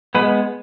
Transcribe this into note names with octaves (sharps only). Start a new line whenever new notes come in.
G#3 B3 B4